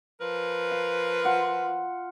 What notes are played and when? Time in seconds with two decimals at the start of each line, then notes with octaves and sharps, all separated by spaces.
0.21 F3 A#4 B4
0.72 F5
1.25 F4 F#5